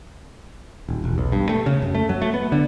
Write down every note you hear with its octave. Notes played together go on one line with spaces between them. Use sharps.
D#1
E1
B1
G2
A3
C#3
F#2
A3
F#3
A3
B3
D3